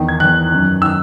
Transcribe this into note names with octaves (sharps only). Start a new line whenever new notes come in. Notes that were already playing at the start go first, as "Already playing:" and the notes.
Already playing: E2 D#3
G#6
E2 D#3 F#6
F#2 D#3
D#3 E6